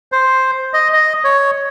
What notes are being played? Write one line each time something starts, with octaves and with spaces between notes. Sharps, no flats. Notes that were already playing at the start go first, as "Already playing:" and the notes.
C5
D#5
D#5
C#5